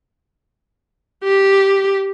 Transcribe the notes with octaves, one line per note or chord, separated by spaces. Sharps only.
G4